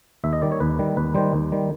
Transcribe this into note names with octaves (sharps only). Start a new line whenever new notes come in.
D#2 E5
D#5
D#3 G3 D5
C#5
D#2 B4
D#3 G3
D#2 B4
D#3 G3 C5
D#2
D#3 G3